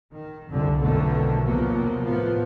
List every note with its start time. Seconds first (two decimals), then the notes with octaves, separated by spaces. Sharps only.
0.13 D#3
0.50 C2 F2 D3
0.80 B1 F2 B2 D3 D#3 A3
1.46 D#2 C3 F3 F#3 A#3 B3
2.03 A2 F3 B3